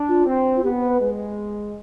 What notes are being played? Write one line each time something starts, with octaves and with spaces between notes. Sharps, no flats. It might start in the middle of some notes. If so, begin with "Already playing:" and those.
Already playing: D4
F4
C4
F4
B3 G4
B4
G#3